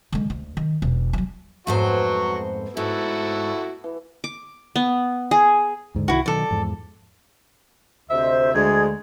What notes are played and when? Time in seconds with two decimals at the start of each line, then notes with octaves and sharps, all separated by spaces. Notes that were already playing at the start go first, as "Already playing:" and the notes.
0.12 D3 G#3
0.30 D2
0.57 D#3
0.82 E1
1.13 F3 F#3
1.67 F2 G#2 F#3 A3 B3 F#4 C5
2.77 G#2 E4 F#4 A4
3.84 E3
4.24 D6
4.76 B3
5.31 G#4
5.95 D#2 G#2 D3
6.08 C2 D#3 E4 F#4
6.26 B2 D#3 F#3 A4 D5
6.50 E2 G#2 F3
8.10 D2 C3 C5 D#5 E5
8.54 D2 G#3 G#4 D5 G#6